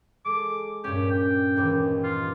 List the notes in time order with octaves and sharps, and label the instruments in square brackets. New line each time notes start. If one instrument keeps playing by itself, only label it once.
[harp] G#3 A4 [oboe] D6
[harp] G2 A#2 C#4 [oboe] G4
[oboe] G5
[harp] E1 D#2 D6
[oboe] F4